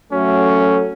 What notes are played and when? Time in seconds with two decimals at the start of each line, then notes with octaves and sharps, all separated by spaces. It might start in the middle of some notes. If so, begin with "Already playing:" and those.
0.12 F#3 A3 C#4